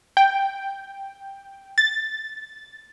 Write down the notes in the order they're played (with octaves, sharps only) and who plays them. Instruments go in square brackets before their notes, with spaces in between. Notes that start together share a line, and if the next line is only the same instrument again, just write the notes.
[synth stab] G5
A6